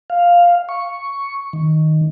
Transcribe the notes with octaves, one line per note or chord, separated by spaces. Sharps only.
F5
C#6
D#3